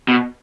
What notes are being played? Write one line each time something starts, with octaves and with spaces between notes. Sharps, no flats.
B2